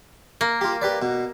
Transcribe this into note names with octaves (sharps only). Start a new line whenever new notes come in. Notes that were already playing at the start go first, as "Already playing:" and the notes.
A#3
F4 G4
G4 B4 D5
B2